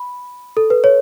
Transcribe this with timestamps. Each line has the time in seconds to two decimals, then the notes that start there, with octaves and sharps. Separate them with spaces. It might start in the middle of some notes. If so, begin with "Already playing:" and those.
Already playing: B5
0.57 A4
0.70 B4
0.84 C#5